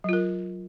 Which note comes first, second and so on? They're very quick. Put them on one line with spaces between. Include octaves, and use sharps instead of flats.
F#3 F4 A#4